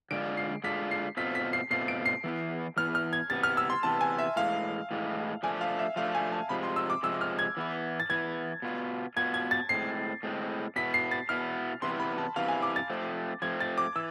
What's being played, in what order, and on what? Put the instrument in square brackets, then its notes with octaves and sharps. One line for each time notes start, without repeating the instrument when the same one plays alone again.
[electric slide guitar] D3 G#3 D4 F4 [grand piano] D7
[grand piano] C7
[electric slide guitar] D3 G#3 D4 F4 [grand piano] B6
[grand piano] C7
[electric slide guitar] B2 A3 C4 F4 [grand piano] B6
[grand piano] B6
C7
[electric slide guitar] B2 A3 C4 F4 [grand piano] C7
[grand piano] D7
C7
[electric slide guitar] E3 B3 E4
[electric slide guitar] E3 B3 E4 [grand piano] F6
[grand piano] F6
G#6
[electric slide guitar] C3 E3 B3 [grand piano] A6
[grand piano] F6
E6
C6
[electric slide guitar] C3 E3 B3 [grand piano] A5
[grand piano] G#5
E5
[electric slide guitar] A2 E3 G#3 [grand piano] F5
[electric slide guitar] A2 E3 G#3
[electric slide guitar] F3 A3 D4 [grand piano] G#5
[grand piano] F5
E5
[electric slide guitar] F3 A3 D4 [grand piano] F5
[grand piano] G#5
A5
[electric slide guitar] C3 F3 G#3 [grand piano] B5
[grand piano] C6
E6
D6
[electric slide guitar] C3 F3 G#3 [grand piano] E6
[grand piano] F6
G#6
[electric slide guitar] E3 B3 E4
[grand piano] A6
[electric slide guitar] E3 B3 E4 [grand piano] G#6
[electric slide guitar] B2 B3 F4
[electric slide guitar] B2 B3 F4 [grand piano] G#6
[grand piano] G#6
A6
[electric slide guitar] A2 G#3 C4 [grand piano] C7
[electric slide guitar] A2 G#3 C4
[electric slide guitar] B2 B3 E4 [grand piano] B6
[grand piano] C7
A6
[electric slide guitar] B2 B3 E4 [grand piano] F6
[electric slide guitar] C3 E3 B3 E4 [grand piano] C6
[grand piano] B5
A5
[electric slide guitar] C3 E3 B3 E4 [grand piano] F5
[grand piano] G#5
D6
A6
[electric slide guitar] F3 A3 C4
[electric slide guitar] F3 A3 C4 [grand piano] G#6
[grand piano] A6
D6
[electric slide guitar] E3 [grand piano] E6